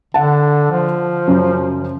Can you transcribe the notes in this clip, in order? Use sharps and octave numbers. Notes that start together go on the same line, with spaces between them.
D3 F#5 A5
F3
F#2 C#3